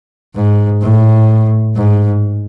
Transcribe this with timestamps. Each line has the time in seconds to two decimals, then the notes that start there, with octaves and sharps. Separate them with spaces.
0.35 G#2
0.82 A2
1.76 G#2